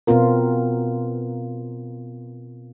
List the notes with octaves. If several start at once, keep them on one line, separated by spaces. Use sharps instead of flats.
B2 B3 C4 F4 A#4